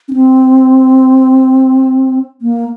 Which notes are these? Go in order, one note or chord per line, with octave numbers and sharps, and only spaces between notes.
C#4
C4
A#3